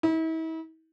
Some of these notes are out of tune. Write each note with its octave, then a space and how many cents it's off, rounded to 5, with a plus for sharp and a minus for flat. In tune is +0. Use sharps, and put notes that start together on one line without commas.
E4 -40